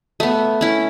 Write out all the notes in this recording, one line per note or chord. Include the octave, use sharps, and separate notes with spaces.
A3 B3
C#4 E4